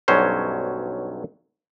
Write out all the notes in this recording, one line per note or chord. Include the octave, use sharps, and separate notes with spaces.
B1 G2 F#3 C#4 C5